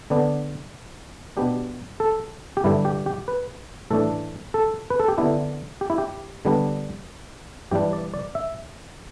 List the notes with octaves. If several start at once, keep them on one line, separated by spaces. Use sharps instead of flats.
D3 B3 D4
B2 B3 D4 G4
A4
G4
G2 D3 G3 D4 E4
G4
G4
B4
A2 E3 A3 D4 A4
A4
B4
A4
G4
D3 B3 D4 E4
G4
E4
G4
D3 G3 B3 D4
G2 E3 G3 D4 G4
D5
D5
E5